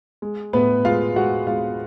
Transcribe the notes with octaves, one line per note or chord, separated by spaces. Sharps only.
G#3
A2 B3 B4
G#3 F4 F5
G#3 F#4 F#5
G#3 F4 F5